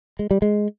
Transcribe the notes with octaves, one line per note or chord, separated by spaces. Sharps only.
G#3
G3
G#3